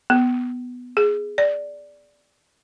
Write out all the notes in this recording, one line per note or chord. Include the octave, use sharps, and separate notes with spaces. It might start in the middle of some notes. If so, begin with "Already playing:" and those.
B3
G#4
D5